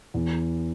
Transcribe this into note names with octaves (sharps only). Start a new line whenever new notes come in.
E2